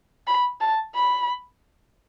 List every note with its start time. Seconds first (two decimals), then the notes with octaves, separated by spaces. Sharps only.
0.27 B5
0.61 A5
0.95 B5